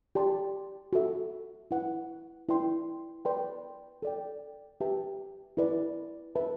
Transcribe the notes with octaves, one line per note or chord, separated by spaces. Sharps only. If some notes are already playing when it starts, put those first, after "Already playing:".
G4 D5 A5 C6
F#4 A4 E5
E4 B4 F#5
E4 B4 D5 G5 C6
B4 D5 G5 C6
A4 D5 G5
G4 B4 E5 A5
E4 B4 D5
B4 E5 A5